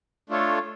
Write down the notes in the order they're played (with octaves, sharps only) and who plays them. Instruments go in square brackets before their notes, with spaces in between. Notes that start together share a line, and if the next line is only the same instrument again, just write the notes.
[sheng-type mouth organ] A3 D4 F4 A4 C#5